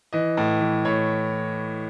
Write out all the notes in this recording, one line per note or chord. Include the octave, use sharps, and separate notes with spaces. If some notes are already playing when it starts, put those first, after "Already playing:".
E3 D#5
A2
E3
A2 C#5